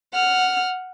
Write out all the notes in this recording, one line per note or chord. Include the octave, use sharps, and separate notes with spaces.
F#5 F6